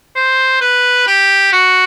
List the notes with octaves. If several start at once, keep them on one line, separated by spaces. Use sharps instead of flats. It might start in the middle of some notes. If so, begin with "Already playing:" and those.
C5
B4
G4
F#4